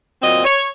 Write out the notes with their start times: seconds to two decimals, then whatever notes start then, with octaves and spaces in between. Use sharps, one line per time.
0.22 A#2 F#3 C4 D#5
0.45 C#5